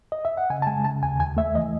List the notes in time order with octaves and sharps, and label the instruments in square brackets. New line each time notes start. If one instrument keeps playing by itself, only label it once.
[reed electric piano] D#5
E5
F#5
C#3 G#5
A5
G#3 G#5
C#3 A5
D#2 G#5
D#2 G#5
A3 E5
E3 D#5